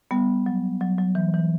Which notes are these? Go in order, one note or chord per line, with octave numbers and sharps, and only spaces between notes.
G3 B3
F#3
F#3
F#3
E3
E3